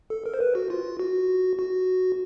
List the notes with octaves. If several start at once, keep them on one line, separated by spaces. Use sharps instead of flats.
A4
A#4
C5
B4
F#4
F4
F#4
F#4